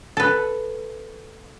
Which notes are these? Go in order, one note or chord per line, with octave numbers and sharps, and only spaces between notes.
A4 B4